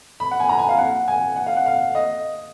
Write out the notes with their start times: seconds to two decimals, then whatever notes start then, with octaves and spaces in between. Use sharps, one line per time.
0.20 B5
0.31 F#5
0.40 G#5
0.49 A#5
0.59 G#5
0.69 F5
0.78 F#5
1.08 G#5
1.36 F#5
1.47 F5
1.57 F#5
1.66 F5
1.95 D#5